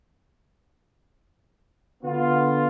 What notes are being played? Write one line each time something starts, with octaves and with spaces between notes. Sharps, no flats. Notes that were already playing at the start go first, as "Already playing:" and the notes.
D3 B3 F4